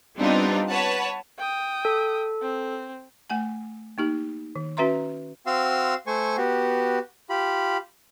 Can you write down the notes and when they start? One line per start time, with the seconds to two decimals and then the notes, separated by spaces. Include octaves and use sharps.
0.16 G3 B3 C4 D4 D#4 F4
0.68 B4 C#5 F#5 A5
1.38 G5 D#6
1.85 A4
2.42 C4
3.30 A3 F#5 G#5
3.98 A#3 D#4 G4
4.55 D#3
4.77 C#4 F#4 B4 E5 A#5 C6
5.46 C4 F#4 F5 C6 E6
6.07 A3 C5 G#5 C#6
6.38 B3 F#4 G4
7.30 F4 G4 B5